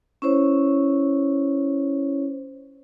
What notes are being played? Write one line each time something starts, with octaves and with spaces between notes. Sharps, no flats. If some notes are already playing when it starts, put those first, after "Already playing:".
C#4 E4 C5 C#5